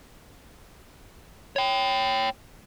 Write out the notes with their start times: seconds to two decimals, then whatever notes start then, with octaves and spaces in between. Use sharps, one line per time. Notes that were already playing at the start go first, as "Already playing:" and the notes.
1.56 C#5 G5